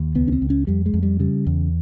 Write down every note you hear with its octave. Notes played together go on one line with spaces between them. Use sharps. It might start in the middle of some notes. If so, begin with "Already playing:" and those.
Already playing: D#2
C#2 B3
C#4
C4
C#2
C#4
F2 G3
G#3
F2
G3
C#3 G3
E2